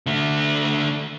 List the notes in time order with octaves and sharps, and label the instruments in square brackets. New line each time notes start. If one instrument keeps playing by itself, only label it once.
[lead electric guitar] D3 A3